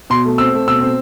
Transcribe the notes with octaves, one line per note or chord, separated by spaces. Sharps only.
B2 C6
A3
C4 E6
A3
B2 E6
C4